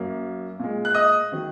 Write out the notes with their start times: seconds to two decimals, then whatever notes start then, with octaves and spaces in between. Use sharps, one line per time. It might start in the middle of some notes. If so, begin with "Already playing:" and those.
Already playing: F#2 F#3 A#3
0.59 A#2 G#3
0.85 F#6
0.94 D#5 D#6
1.32 D#3 F#3